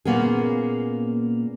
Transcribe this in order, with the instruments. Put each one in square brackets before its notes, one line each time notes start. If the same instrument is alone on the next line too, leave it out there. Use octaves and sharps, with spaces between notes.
[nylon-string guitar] A#2 A#3 B3 C#4 G#4